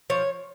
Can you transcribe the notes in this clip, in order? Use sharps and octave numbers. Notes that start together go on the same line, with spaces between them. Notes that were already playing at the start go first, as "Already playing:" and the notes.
F3 C#5